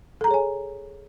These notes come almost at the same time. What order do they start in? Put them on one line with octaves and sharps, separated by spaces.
A4 A#5 G#4 C#5 G#5